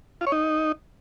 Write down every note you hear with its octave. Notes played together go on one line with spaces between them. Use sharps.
F4
C#5
D#4